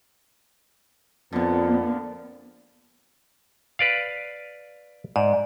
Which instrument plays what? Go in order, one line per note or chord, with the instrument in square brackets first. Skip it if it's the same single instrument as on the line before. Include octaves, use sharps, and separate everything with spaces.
[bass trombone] F2 [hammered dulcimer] A#2 D3 [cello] B3
[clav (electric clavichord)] B4 D5 F5
[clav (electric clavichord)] G#2 [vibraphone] D5